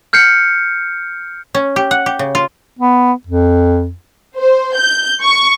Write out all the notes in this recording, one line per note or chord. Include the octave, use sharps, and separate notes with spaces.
F6 G6 C7 C#7
C#4
G4
F#5
G4
C#3
F4
B3
F2
C5
G6
C#6